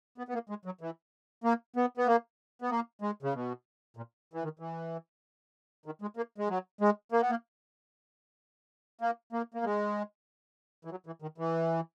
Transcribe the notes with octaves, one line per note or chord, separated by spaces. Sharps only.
B3
B3
A#3
G#3
F#3
E3
A#3
B3
B3
A#3
B3
A#3
G#3
C#3
B2
A#2
E3
D#3
E3
D#3
G#3
A#3
G#3
F#3
G#3
A#3
B3
A#3
A#3
A#3
A#3
G#3
E3
F#3
E3
D#3
E3